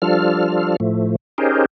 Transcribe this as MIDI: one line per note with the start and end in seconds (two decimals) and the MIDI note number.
0.02 0.76 53
0.02 0.76 55
0.02 0.76 62
0.02 0.76 65
0.02 0.76 69
0.02 0.76 89
0.80 1.16 45
0.80 1.16 53
0.80 1.16 57
1.38 1.65 61
1.38 1.65 63
1.38 1.65 67
1.38 1.65 68
1.38 1.65 70
1.38 1.65 72